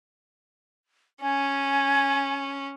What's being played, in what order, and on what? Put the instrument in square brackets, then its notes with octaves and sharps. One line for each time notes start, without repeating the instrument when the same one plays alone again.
[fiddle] C#4 [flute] G#5